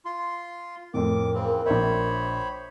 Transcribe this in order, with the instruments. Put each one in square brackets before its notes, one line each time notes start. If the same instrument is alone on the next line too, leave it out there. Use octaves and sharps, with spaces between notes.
[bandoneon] F4 C6
[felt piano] F2 A2 [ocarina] A#4 [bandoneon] D6
[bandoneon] C#3 E3 C4
[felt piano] A#1 E5 [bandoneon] C5 C#5 B5